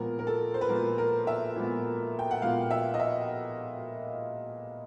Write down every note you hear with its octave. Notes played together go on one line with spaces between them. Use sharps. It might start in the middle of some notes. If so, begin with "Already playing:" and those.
Already playing: A#2 F3 G#3 B3 A#4
A#4
A4
C5
B4
A#2 F3 G#3 B3 A#4
A#4
E5
A#2 F3 G#3 B3
G5
F#5
A#2 F3 G#3 B3 F5
E5
D#5
E5